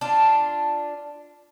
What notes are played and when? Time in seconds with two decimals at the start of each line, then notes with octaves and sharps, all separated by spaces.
0.01 D4 F4